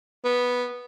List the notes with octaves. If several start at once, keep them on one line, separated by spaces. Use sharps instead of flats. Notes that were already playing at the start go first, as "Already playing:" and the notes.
B3